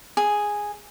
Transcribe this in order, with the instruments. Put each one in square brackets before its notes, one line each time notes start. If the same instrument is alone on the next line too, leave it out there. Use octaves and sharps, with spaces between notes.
[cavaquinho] G#4